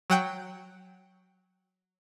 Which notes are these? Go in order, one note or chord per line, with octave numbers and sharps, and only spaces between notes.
F#3 F#5 G5